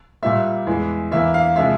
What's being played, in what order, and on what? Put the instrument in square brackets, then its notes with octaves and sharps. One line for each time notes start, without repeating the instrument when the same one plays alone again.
[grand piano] A#2 G3 A#3 E5
E2 E3 G#3
E2 E3 A#3 E5
F5
C3 F3 G#3 E5